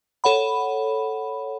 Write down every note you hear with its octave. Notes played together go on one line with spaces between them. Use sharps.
A4 C#5 F#5 B5